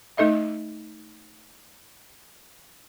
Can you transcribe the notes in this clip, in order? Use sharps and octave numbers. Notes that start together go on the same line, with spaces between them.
A3 D#4 A4 D#5 E5